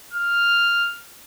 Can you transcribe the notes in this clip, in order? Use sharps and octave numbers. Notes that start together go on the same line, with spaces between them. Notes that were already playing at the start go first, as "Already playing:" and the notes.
F6